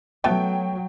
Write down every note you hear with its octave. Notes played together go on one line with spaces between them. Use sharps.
F#3 A3 B3 A4 G5